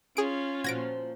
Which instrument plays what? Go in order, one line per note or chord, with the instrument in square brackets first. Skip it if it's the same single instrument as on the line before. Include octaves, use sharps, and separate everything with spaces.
[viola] C#4 F4 [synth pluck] G#4 D7
[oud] A#2 F3 F#4 [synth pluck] G#6 A#6 D7